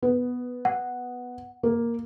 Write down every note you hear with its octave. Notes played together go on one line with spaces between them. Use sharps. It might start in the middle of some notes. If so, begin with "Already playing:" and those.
B3
F#5
A#3